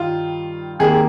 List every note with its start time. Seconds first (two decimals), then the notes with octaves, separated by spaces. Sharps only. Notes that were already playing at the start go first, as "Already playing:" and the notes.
Already playing: G2 D#3 G3 F4
0.79 C3 D#3 A#3 G#4